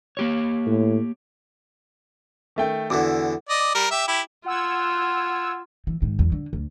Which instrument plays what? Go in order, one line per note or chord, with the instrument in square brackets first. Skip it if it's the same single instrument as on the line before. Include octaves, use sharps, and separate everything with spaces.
[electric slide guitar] A#3 G4 C#5
[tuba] A2
[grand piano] D#3 A3 G5
[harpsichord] E2 D3 E3 [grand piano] F#4 D6
[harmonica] D5 D#5
G3 A#4
G4 E5
E4 G4
[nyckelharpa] F4 [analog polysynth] F#5 E6 G#6
[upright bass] E3
G#2 D#3
E2
D3
D2